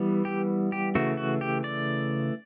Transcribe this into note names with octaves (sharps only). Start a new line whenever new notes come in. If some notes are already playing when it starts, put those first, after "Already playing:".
Already playing: E3 G3 B3
G4
G4
C#3 E3 A3 F#4
F#4
G4
D5